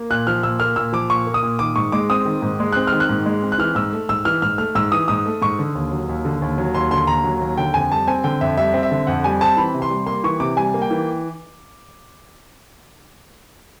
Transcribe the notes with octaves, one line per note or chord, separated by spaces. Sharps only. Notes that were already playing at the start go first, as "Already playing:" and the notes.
Already playing: A#3
A#2 F#6
F3 F6
A#2 E6
A#3 F6
A#2 E6
F3 D6
A#2 C#6
A#3
D#6
A#2
D#3 D6
G#2 C#6
G#3 D6
C4 D#6
D#3
G#2
G#3
C4 F#6
F6
D#3
F#6
G#2
G#3
C4
F#6
E3 F6
G#2 E6
A3
G#2 E6
E3 F6
G#2 F6
A3 F6
G#2 E6
E3 D#6
G#2 D#6
A3
G#2 C#6
D3
D#2
F#3
D#2
D3
D#2
F#3
D#2 C6
D3 C6
D#2 A#5
F#3
D#2
D3 G5
F2 G#5
G3 A5
C4 G#5
D3 G5
F2 E5
G3 E5
C4
E5
D3
F2 F#5
G3 G#5
C4 A5
E3 B5
C3
C6
G3
A#3 C6
E3 C#6
C3 D6
G3 G#5
A#3
G5
E3